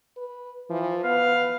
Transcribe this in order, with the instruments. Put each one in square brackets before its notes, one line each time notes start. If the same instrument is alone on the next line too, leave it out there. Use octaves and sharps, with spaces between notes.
[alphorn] B4
[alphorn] E3 [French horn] F3
[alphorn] B3 [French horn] B4 [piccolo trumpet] F5